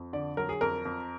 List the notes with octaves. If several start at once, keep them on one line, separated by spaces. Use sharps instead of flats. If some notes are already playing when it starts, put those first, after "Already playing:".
Already playing: F2
D3 D5
F#3 A#4
G#4
F2 A#4
F2